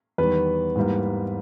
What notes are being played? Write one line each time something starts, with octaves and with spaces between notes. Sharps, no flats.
E2 D#3 G3 B3 B4
G#2 E3 G3 A#3